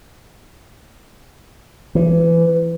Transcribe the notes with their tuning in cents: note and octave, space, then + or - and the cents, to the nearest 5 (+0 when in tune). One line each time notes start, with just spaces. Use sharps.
E3 +25